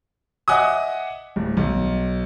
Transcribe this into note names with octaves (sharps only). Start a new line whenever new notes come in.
D#5 E5 F#5 G#5 D6 D#6
D1
B1